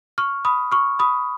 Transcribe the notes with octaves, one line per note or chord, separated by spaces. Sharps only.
C#6 F6
B5 D#6
C#6 F6
B5 D#6